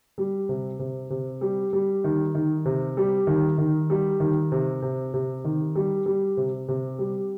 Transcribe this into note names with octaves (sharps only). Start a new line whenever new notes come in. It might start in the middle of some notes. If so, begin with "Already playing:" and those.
G3
C3
C3
C3
G3
G3
D#3
D#3
C3
G3
D#3
D#3
G3
D#3
C3
C3
C3
D#3
G3
G3
C3
C3
G3